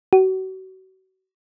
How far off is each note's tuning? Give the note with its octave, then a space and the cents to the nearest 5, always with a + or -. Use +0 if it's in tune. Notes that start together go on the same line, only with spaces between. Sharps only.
F#4 +35